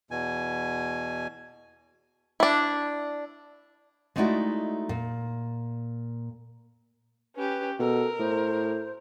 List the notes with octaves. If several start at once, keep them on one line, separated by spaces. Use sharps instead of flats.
E2 B2 G#5
D4 E4
G#3 A3 D#4 E4 F#4 D5
A#2
C#4 G4 B4
B2 A4 A#4
A2 C5